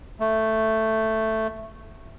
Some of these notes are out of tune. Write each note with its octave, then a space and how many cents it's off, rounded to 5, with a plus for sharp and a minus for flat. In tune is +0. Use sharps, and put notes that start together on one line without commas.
A3 +5